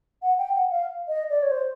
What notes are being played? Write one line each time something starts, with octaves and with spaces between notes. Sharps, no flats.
F#5
G5
F#5
F5
D#5
D5
C#5
C5